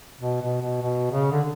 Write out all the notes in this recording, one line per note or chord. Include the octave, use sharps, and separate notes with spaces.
B2
B2
B2
B2
C#3
D3